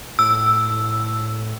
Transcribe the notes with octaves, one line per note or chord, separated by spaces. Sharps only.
A2 E6